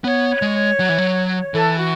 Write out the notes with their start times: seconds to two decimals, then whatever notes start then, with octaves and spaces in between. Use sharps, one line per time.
0.04 B3 C#5
0.42 G#3
0.80 F#3
0.89 E3
0.98 F#3
1.54 E3 A4
1.79 F#4